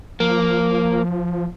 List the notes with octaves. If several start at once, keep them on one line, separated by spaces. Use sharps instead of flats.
F3 A#3